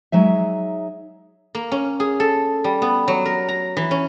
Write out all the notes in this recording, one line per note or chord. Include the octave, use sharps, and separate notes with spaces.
F#3 G#3 D#4 E5
A#3
C#4
G#4
A4
G3
B3
F#3
A#4
A#5
E3
C#4